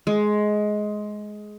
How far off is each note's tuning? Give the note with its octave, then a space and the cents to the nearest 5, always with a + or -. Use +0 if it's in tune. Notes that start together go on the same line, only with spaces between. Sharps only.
G#3 +15